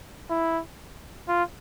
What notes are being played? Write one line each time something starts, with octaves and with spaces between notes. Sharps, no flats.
E4
F4